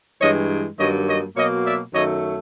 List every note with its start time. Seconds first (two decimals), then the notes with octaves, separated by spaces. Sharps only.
0.21 G2 E3 G#3 C#5 D#5
0.78 G2 D#3 F#3 A#3 C#5 D#5
1.07 C#5 D#5
1.35 B2 F#3 A#3 C#5 D#5
1.65 D5 E5
1.93 F#2 D#3 F#3 A3 C#5 D#5